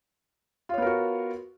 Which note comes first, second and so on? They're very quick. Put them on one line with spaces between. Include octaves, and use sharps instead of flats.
F4 C#5 B3 A#4 F#4